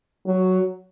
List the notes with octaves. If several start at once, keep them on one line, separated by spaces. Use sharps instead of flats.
F#3